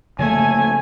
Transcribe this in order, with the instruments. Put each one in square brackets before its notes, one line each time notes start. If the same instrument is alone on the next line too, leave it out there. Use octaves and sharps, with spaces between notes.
[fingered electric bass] C#3 F3 A#3 [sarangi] A3 [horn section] G#5